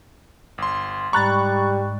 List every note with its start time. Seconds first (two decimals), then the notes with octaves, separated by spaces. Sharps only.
0.58 G1 C6
1.13 G#2 G3 A#5 B5 C#6 F#6 A6